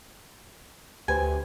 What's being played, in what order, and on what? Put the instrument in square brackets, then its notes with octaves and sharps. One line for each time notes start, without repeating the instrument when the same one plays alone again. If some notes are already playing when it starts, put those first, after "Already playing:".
[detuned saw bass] D2 [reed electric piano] G4 B4 C5 [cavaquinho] G#5